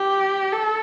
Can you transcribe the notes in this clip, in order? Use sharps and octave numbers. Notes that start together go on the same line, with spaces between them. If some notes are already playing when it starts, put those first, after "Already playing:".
Already playing: G4
A4